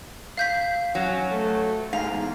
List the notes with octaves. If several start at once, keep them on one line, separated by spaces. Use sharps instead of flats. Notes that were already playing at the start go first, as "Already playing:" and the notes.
F5 G6 B6
F#3 C#4
A3
G#2 F5
E2